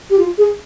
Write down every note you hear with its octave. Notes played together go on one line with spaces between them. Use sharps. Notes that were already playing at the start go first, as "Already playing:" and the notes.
G4
F4
G#4